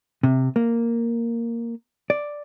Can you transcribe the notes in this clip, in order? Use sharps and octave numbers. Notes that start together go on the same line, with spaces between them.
C3
A#3
D5